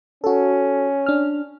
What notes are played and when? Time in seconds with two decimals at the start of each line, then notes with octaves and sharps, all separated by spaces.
0.24 C#4 F#4 A4
1.06 D4 F6